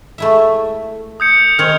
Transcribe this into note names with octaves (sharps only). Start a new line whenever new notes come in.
A3 E4 E5
D#6 G6 C#7
D#3 C4 F6 G#6 F7